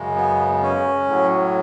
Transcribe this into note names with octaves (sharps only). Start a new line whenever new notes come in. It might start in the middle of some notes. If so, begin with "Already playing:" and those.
Already playing: F#2 C#3 G#3
B3
C#4
A2 F#3